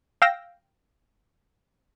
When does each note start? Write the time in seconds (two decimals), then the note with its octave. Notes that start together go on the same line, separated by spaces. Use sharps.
0.22 F5 G5 E6 A#6